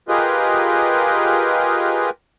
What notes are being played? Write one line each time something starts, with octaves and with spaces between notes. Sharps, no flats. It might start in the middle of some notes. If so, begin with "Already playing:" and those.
F4 G4 G#4 A#4 B4 D#5